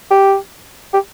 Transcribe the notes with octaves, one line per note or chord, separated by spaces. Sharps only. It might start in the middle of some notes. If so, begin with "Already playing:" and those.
G4
G4